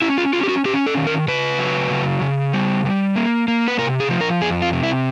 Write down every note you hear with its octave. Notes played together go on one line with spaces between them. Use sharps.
C#4 E4
F4
C#4 F4
G4
F#4
C#4 G4
A4
D#3
A#4
C#3 B4
F#3
C#3
C#3
G3
G3
A#3
A#3
B4
C3 A#4
G#4
F3
A#4
F2 G#4
F4
C3
E4